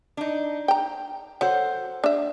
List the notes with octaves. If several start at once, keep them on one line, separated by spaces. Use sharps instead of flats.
D4 D#4
G5 A#5
F#3 A4 C5 F#5
D4 E5